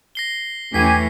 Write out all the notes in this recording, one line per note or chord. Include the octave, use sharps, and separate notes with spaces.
A#6 C7 G7
E2 E3 A3 C#4 G4 G#5 B6 C7